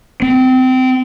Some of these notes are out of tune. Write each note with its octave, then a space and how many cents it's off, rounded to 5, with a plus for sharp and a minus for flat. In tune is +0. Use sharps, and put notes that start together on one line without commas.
C4 -25